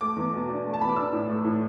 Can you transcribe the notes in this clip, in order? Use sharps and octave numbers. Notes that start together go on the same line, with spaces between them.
A3 D6
E2
B2
D4
A3
A5
E2 B5
D6
D4 E6
A2
A3
A2